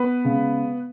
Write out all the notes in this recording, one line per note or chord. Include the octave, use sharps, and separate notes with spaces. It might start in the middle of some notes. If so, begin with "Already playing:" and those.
Already playing: B3 B4
C#3 G#3